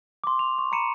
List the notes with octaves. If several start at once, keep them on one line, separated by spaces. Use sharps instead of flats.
C6 D6
F7
C#6
A#5 B5 C#7 D#7 E7